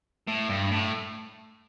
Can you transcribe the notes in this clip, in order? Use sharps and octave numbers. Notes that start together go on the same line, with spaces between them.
A2
G2
A2